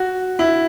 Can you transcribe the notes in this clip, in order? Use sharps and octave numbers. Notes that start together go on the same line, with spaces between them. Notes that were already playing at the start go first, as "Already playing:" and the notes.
Already playing: F#4
E4